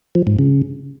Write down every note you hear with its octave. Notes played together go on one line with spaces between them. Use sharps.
F3
G#2
C#3